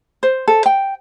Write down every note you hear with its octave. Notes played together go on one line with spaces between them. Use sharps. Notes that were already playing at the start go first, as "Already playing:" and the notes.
C5
A4
G5